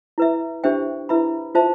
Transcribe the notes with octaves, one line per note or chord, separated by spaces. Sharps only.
E4 B4 E5
D4 G4 C5 E5 G5
E4 B4 E5 B5
F4 C5 E5 A5